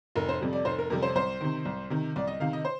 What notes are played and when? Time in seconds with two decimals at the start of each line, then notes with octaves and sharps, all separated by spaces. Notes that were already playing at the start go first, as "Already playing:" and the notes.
0.16 F1 A#4
0.29 C5
0.41 F2 C3 G3
0.53 D5
0.65 F1 C5
0.79 A#4
0.90 F2 C3 G3 A#4
1.03 C5
1.15 C2 C5
1.41 C3 D#3
1.65 C2
1.90 C3 D#3
2.16 C2 D5
2.27 D#5
2.40 C3 D#3 F5
2.53 D#5
2.65 C5